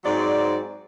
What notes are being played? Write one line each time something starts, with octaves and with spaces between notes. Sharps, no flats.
G#2 F#3 C4 D5